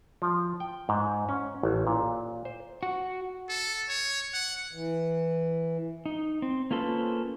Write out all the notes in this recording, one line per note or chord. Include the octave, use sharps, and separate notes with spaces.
F3
G5
G#2
C#4
A1
A#2
C5
F#4
A4
C#5
F#5
E3
D#4
C4
A#3 C#4 F4 A4 B4 C5